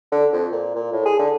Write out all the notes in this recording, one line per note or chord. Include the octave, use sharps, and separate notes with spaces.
D3
F2
A#2
A#2
A2
G#4
D3